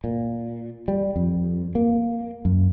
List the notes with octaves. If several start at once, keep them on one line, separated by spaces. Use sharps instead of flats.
A#2
G3
F2
A#3
F#2